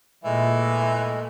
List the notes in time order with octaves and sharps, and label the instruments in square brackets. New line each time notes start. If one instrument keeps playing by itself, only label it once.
[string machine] A#2 [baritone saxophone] E3 [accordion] G#3 A3 [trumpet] E5